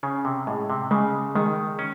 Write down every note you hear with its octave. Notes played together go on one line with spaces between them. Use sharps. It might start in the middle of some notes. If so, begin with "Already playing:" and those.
C#3 C#4
C3
A2 G#3
C3
C#3 G#3
D#3 G#3
C#4